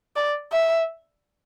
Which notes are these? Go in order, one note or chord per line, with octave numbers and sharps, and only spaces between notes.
D5
E5